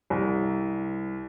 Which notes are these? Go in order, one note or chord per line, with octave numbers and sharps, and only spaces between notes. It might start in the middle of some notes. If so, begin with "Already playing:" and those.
C2